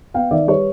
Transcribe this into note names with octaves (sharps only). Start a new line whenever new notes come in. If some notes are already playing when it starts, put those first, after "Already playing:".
B3 F5 G5
D#3 D5 E5
G3 B4 C#5